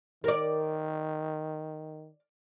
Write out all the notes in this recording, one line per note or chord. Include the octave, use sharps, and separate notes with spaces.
D#3 A#4 D5